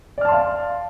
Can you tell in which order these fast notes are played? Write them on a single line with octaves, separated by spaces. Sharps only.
D5 F6 A5 C6 F5